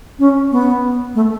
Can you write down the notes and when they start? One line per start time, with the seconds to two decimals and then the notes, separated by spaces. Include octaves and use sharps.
0.19 C#4
0.52 B3
1.15 A3